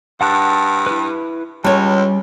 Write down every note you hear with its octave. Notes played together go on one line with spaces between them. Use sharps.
G2 F#5 A5 F#6
E4 B4
C#2 G3 C#4 C#5